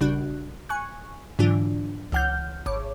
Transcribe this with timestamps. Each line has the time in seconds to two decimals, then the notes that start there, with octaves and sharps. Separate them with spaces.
0.01 A#1 C#3 G3 D4 F#4 F#6
0.69 G#5 C#6 F#6
1.39 G#2 D3 E3 F#3 D4 F4
2.12 C#2 E3 F#5 F6 G6
2.66 G#1 C#5 D6